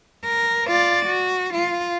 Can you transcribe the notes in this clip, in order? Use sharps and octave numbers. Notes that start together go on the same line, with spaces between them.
A#4
F4 D5
F#4
F4